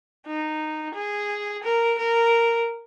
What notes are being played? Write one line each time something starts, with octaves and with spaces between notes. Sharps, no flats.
D#4
G#4
A#4
A#4